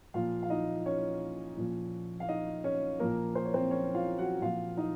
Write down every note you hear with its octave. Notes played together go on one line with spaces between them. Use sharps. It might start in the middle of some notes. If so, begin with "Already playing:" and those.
A#2 F3 F4 F5
F5
D#4 D#5
C#4 C#5
A#2 F3
F5
D#4 D#5
C#4 C#5
A#2 F3 A#3 A#4
C5
C#5
C4 C5
C#4 C#5
F4 F5
F#4 F#5
A#2 F3 F4 F5
D#4 D#5